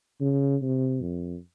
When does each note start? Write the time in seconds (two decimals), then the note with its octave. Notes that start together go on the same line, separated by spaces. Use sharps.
0.20 C#3
0.62 C3
1.02 F2